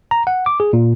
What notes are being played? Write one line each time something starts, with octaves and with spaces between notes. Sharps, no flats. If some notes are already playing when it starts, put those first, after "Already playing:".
A#5
F#5
D6
G#4
A#2